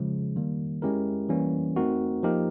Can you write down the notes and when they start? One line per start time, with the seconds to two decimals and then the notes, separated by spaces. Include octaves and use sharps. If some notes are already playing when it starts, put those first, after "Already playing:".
Already playing: C#3 F3 G#3
0.36 D#3 G3 A#3
0.82 G#3 C#4 E4 G4 A#4
1.29 E3 G3 A#3 C#4
1.76 A3 C4 D#4 F#4 A#4
2.23 F3 A#3 D#4 G4 A#4